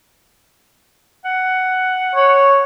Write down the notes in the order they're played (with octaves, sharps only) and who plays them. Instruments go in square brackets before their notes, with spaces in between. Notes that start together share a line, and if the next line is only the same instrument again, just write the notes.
[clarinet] F#5
[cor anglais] C#5